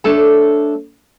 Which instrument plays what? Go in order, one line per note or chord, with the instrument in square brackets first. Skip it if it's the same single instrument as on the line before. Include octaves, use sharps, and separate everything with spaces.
[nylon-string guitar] A3 D4 A4 C#5 D5 A5